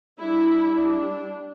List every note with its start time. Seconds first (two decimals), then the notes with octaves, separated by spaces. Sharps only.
0.19 G3 D4 E4
0.73 D4